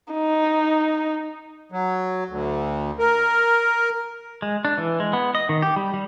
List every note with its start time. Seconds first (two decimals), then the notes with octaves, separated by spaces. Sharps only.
0.14 D#4
1.72 F#3
2.29 D2
2.99 A#4
4.42 G#3
4.65 D4
4.78 E3
5.00 G#3
5.13 B3
5.35 D#5
5.49 D#3
5.62 G4
5.76 G3
5.94 G3